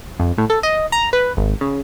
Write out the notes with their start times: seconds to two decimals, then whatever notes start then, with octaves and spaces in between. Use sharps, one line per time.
0.20 F2
0.38 A2
0.50 A4
0.63 D#5
0.92 A#5
1.13 B4
1.37 G#1
1.61 C#3